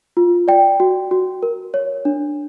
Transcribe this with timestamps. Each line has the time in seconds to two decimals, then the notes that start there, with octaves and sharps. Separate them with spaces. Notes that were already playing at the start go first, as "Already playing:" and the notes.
0.17 F4
0.48 D5 G5
0.80 F#4
1.11 F#4
1.43 A#4
1.74 C#5
2.05 D4